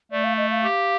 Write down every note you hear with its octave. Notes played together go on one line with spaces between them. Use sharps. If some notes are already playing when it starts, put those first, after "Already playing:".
A3 D5
F5
D#5
F5
G4